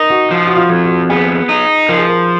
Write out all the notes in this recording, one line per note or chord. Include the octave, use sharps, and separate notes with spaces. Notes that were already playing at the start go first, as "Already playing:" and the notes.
Already playing: D#4 A#4
F#4
F3 F4
F#4
F4
F2
F#4
B3 G#4
D#4
F3 A#4
G#4
A#4